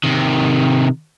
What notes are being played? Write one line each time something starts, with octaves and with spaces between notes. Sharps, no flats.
C3 D#3